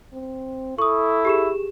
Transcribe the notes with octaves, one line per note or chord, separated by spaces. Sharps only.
C4
E4 A4 C#6 D#6
G4 G#4 E7